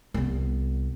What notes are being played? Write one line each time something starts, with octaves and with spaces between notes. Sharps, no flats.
C2 B3